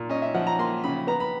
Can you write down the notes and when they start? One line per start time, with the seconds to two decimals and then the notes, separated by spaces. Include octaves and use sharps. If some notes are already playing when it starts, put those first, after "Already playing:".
Already playing: A#2
0.09 C#4 D#5
0.22 E5
0.34 F3 F#5
0.47 A#5
0.59 A#3 C6
0.84 C#3 B5
1.07 B3 A#5
1.20 B5